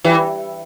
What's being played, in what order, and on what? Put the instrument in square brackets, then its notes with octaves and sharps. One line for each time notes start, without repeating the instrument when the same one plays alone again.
[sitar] E3 [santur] G3